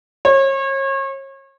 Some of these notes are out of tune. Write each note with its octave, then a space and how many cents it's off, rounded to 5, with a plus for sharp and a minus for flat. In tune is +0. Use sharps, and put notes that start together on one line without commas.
C#5 -35